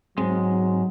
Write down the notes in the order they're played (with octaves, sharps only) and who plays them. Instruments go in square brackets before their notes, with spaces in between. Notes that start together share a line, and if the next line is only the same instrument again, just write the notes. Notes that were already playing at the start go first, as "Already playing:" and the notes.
[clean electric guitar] G#2 G#3 [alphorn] F#3 [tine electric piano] C4